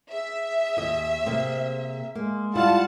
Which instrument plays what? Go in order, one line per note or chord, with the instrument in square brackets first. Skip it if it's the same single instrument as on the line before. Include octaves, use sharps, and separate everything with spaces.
[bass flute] G#4 [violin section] E5
[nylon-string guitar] D#2 D#5
C3 A#3 C4
[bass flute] G#3 [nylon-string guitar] A#3
[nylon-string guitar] G3 E4 [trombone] F4 [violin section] F#5 A5